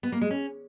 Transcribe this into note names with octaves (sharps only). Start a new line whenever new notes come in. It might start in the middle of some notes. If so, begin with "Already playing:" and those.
B3
A#3
G#3
C#4